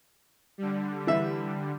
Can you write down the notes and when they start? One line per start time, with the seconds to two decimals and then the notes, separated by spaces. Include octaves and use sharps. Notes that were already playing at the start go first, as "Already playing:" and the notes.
0.58 D3 G3
1.07 E3 E5